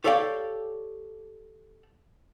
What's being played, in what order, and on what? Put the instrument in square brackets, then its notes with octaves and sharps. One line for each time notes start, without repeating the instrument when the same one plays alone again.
[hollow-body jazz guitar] G4 A4 C#5 D5 F5 G5